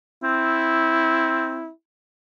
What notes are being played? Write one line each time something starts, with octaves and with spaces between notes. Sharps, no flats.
C4 E4